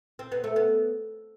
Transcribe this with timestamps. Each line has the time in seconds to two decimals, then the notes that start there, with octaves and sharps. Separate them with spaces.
0.19 C4
0.32 B3
0.44 A3
0.56 B3